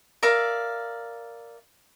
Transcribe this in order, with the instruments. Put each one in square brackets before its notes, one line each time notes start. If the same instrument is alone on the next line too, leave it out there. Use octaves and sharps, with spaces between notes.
[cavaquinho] A#4 D5 E5 F5